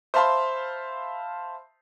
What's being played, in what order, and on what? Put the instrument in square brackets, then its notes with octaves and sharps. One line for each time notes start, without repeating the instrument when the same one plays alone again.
[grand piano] C5 E5 F5 A5 B5 C6